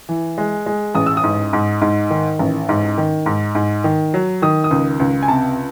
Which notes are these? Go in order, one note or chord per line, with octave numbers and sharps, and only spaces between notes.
E3
G#3
G#3
A1 D#6
E6
D#6
G#2
G#2
G#2
D#3
A1
G#2
D#3
G#2
G#2
D#3
F#3
D#3 D#6
D#6
C#2
C#2
G#5
C3 A5